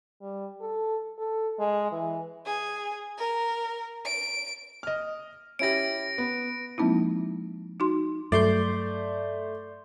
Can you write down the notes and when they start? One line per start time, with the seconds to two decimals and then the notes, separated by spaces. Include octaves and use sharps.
0.21 G3
0.60 A4
1.18 A4
1.59 G#3
1.92 E3
2.46 G#4
3.18 A#4
4.05 D7
4.83 D#5 F6
5.59 C#4 E4 G4 A#6 D7
6.18 B3
6.78 F3 G#3 A#3 C4 D#4 E4
7.80 D#4 F#4 C6
8.32 G2 F#3 A3 D5 C6 G6